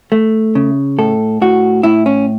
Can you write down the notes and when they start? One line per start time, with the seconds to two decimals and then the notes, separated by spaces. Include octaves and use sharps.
0.12 A3
0.55 C#3
0.98 A2 A4
1.41 A2 F#4
1.83 A2 E4
2.06 C#4